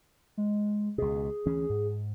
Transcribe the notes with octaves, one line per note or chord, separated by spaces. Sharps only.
G#3
C#2 B2 G#4
D2 E3 C#4 G#4
G#2